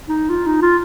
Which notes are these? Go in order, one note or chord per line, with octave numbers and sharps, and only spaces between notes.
D#4
F4
D#4
F4